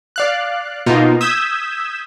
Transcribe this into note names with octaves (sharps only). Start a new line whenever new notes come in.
D5 F5 F#6
B2 A#3 D#4 F4
D#6 E6 G6 G#6 B6 E7